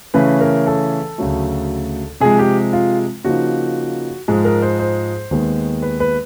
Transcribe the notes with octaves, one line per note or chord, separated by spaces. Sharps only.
C#3 E3 A3 C#4 B4
A#4
A4
D2 C#3 F#3 A3
C3 F3 G#3 G#4
G4
F4
C#3 F3 A#3 D#4 F#4
G#2 F3 G#3
A#4
C5
C5
D#2 D#3 G#3 B3
B4
B4